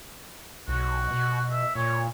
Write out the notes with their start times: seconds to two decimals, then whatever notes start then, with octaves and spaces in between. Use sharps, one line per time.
0.68 B1 F#4
1.11 B2
1.51 E5
1.75 A#2 C#5